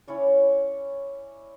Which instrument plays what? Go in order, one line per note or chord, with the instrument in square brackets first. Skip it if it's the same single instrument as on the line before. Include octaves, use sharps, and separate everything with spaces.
[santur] C#4 E4 C#5 D5